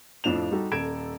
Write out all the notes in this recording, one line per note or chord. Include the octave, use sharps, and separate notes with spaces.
F2 A2 F3 D4 E7 F7
G3 D#4 F#4 A4
D#1 A4 G#6 D7 E7